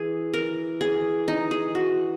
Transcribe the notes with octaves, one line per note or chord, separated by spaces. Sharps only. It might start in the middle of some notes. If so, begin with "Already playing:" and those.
Already playing: E3 G#4
A#4
G#4
D#4
G#4
F#4